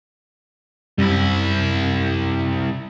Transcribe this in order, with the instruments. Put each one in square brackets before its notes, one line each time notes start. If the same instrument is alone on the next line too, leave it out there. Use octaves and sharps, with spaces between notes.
[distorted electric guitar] C2 E4 [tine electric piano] F#2 G3